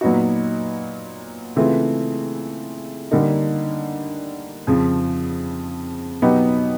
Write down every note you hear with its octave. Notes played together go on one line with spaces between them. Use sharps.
A#2 F#3 B3 D#4 F#4
C#3 E3 A3 C4 F4
D3 G3 A#3 D#4
F2 C#3 F3
B2 F#3 B3 D#4 G4